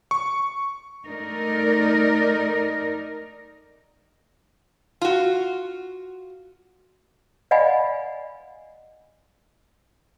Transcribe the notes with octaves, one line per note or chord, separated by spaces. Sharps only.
C#6
A3 D#4 A#4 D5
F4 F#4
D5 D#5 F5 F#5 G#5 B5